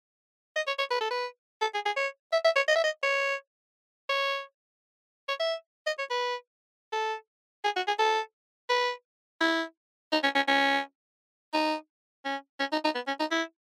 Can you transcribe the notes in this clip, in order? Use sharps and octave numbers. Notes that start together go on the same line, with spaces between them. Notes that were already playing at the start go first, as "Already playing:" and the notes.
D#5
C#5
C#5
B4
A4
B4
A4
G#4
G#4
C#5
E5
E5
C#5
D#5
E5
D#5
C#5
C#5
C#5
E5
D#5
C#5
B4
A4
G#4
F#4
G#4
A4
B4
E4
D#4
C#4
C#4
C#4
D#4
C#4
C#4
D#4
D#4
B3
C#4
D#4
E4